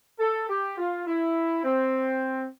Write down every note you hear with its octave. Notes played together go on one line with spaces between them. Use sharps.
A4
G4
F4
E4
C4